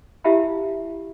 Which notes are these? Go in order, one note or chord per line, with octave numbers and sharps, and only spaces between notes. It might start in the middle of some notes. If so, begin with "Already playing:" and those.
E4 G4 E5 F5 A5 B5